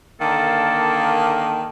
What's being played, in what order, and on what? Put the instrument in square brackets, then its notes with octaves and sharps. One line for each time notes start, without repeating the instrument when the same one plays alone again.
[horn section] D3 A#3 [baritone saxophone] D#3 [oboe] A4 [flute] A5